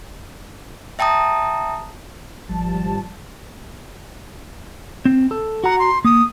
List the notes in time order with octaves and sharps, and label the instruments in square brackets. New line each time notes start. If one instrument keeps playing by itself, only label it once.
[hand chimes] E5 G5 A5 A#5 D#6
[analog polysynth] G#1 F3 G3 A5
[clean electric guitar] C4
A4
[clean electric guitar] F#4 A#5 [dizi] F#5
[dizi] C6
[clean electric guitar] A#3 [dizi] D#6